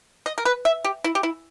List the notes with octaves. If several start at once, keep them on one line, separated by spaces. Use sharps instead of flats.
D#5
A#4
B4
E5
G4
E4
G4
E4